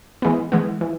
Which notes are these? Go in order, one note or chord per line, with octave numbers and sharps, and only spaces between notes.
E3 G#3 B3
E3 G#3 B3
E3